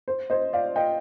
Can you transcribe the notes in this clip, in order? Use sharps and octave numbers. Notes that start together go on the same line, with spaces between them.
C5
C5 D#5
D5 F5
D#5 G5